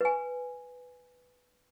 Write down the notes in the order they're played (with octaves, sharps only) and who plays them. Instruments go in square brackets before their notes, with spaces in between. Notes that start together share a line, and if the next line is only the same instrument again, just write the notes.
[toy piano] B4 G#5